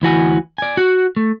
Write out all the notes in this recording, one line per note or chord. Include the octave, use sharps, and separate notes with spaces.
D2 E3 F#4 G#5
D5 G#5
F#4
A3